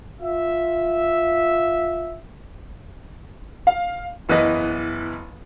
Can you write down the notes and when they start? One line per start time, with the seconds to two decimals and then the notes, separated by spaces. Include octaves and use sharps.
0.21 F4 E5
3.67 F5
4.29 F#1 E3 B3 B4 D#5